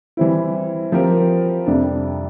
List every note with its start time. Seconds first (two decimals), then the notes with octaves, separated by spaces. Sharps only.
0.17 E3 G3 C4 E4
0.92 F3 C4 G4 A#4
1.67 F2 C3 G3 D4